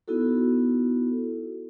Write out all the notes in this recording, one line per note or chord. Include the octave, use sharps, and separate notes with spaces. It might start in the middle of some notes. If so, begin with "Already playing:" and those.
B3 D#4 E4 F#4 A4